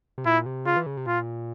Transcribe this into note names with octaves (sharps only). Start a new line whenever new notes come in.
C3
A#2 E4
C3
C#3 F4
E3
C#3
C3
A#2 F4